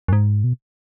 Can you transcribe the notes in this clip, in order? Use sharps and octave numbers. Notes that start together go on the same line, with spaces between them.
F#2
G#2
B2